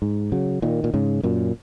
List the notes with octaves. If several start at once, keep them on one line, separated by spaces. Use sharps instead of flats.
G#2
C#3 F#3
A#2 D#3
A#2
G#2 C#3
F#2 A#2